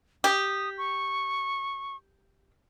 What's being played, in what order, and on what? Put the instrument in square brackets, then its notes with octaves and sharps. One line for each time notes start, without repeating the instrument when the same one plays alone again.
[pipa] G4 [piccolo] D#6
[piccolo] C#6